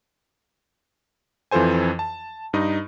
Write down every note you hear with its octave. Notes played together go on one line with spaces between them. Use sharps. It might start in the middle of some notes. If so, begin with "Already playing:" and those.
F2 E3 F4 A4 C5 G#5
A5
G2 D#4 D#5